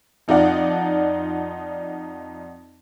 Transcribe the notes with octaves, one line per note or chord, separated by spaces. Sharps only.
F2 D#4 F4 D5 F#5 A5